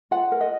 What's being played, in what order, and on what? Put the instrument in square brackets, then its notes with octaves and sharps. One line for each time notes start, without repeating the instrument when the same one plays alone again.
[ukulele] F4 F#5
A#4
D#5